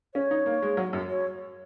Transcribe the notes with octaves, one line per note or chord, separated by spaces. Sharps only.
C#4 C#5
D#4
A#3
G#3
F#3
F#2
C#5